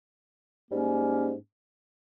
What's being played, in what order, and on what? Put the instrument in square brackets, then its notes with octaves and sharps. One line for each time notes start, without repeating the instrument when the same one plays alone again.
[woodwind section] G#2 G3 A#3 C#4